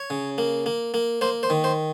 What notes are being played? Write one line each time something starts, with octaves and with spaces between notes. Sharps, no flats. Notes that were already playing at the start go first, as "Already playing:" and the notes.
Already playing: C#5
C#3
A#3
A#3
A#3
A#3 C5
C5
D#3
C5